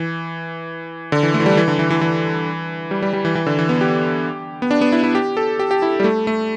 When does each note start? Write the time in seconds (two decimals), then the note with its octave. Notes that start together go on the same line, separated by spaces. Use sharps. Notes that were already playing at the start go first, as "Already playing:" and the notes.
Already playing: E3
1.12 D3
1.23 E3
1.34 A3
1.40 E3
1.46 G3
1.57 E3
1.68 D3
1.79 E3
1.90 E3
2.01 E3
2.91 G3
3.02 G3
3.13 G3
3.25 E3
3.35 E3
3.46 D3
3.59 E3
3.69 B3
3.81 G4
4.62 B3
4.71 D4
4.81 B3
4.92 E4
5.04 E4
5.15 G4
5.37 A4
5.59 G4
5.71 G4
5.82 E4
6.00 G3
6.04 A3
6.27 A3